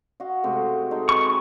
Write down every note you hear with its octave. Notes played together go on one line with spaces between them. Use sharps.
F#4 D#5 F5
C3 G#3 A3
G#3 D#4 A4
C4 B4 G#5 C#6